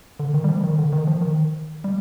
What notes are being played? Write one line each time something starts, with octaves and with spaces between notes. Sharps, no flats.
D3
D#3
G3
F3
D#3
D3
D#3
F3
D#3
G3